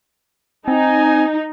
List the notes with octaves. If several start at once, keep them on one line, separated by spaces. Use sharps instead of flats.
C4 D#4 G#5